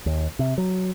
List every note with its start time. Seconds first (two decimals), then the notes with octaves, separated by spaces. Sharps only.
0.06 D#2
0.39 C3
0.58 F#3